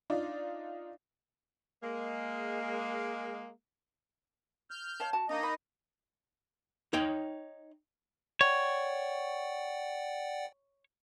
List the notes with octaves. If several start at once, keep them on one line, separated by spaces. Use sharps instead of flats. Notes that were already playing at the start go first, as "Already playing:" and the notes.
D4 D#4 F4 D5
G#3 A#3
F6 G6
C#5 F5 A5
F#4 A5
A#3 D4 D#4 D#5
B5
D#4 C#5 G5
C#5 D5 F#5 G5